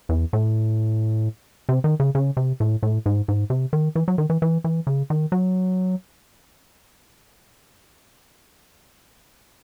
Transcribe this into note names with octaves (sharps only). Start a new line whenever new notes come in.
E2
A2
C3
D#3
C#3
C#3
C3
A2
A2
G#2
G#2
C3
D#3
E3
F#3
D#3
E3
E3
E3
C#3
D#3
F#3